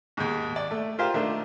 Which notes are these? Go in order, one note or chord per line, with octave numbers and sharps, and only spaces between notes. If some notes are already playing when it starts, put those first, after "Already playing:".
D#2 G#2
D5
A3
F4 G4 A#4 C5 F5
D#3 A3 D4